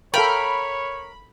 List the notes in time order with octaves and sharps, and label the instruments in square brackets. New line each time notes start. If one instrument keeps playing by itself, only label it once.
[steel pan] A4 F5 G5 [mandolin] A#4 [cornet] C#5 [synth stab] B5